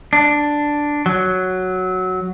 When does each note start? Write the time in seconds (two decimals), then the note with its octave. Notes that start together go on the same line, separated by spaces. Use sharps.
0.13 D4
1.06 F#3